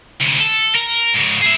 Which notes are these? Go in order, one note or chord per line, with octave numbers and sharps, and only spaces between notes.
D2 C3
A4
A#4
G#2 C#3
G#4 E5